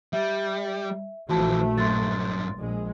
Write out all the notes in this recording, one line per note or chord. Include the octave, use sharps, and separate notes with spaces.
G3 E5
A#1 E3 F3 A3 F#4 A5
G2 F#3 C6 A6
A#1 G#3